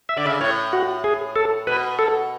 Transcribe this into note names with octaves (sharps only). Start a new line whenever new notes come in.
E5
D3 D5
C#3 E5
A2 C#5
F#4
G#4
A4
B2 B4
A4